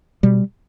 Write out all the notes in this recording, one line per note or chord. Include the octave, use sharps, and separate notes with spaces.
B2 G3